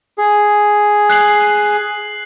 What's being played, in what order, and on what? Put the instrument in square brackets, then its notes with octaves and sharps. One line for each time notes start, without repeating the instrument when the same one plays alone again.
[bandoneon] G#4
[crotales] F#6 C7 F#7